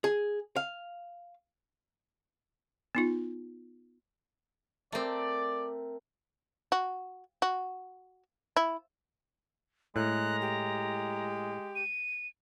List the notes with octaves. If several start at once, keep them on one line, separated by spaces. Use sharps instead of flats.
G#4
F5
B3 D#4 F4
A3 C4 A#4 D5 A5 A#5
F#4
F#4
E4
A2 G#3 A#5 F#6
G4
D#7